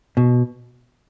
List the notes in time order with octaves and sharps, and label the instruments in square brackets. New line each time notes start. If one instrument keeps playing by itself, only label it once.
[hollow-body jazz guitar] B2